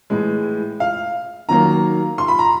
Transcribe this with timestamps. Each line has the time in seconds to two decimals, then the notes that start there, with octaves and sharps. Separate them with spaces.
0.10 A2 E3 G#3
0.80 F5
1.49 D#3 F#3 A#3 A#5
2.18 C6
2.28 B5
2.39 A#5